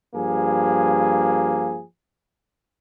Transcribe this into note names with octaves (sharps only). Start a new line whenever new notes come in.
G2 F3 A#3 G#4